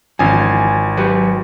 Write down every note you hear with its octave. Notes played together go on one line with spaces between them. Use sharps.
G#1 E3 F3 C#4 G#5
F#3 G4 B4